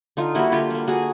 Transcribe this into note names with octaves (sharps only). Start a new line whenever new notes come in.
D3 D#4 F4
G3 A#3 E4 F#4
D3 F4 G4
G3 A#3
D3 F#4 G#4